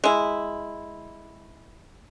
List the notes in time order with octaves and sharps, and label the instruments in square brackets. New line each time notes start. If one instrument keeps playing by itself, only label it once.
[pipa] G#3 E4